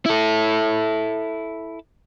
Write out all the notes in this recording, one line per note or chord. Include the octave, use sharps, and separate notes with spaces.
E4 A4